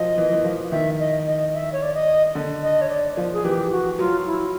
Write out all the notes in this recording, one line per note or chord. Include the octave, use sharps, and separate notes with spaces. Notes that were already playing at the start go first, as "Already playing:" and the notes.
Already playing: F3 F#3 D#5
E3
E3
F3
D#3 E5
D#5
D#5
E5
C#5
D5
D#5
D3
D#5
C#5
D5
F3
G#4
E3 G4
F#4
F#3 F4
E4